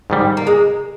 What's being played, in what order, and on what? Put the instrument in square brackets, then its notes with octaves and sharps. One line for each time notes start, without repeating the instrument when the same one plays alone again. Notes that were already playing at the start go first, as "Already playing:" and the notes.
[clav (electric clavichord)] G#2 D#3 G3
[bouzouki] A#3
G#3